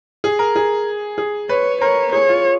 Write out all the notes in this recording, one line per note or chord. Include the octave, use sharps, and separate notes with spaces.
G#4
A#4
G#4
G#4
B4 C#5
A#4 C#5
G#4 C#5
F4